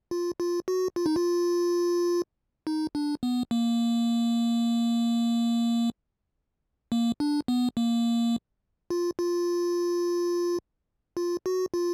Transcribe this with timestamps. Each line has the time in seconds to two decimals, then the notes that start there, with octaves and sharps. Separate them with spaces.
0.11 F4
0.40 F4
0.68 F#4
0.96 F4
1.06 D#4
1.16 F4
2.67 D#4
2.95 D4
3.23 B3
3.51 A#3
6.92 A#3
7.20 D4
7.48 B3
7.77 A#3
8.90 F4
9.19 F4
11.17 F4
11.46 F#4
11.74 F4